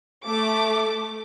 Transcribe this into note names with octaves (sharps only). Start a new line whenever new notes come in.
A3 D6